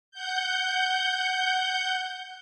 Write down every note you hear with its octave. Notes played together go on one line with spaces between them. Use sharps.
F#5 G6